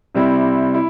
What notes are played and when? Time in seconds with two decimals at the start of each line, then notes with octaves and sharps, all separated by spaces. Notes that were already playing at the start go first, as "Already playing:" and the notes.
0.15 C3 G3 C4 E4
0.74 E4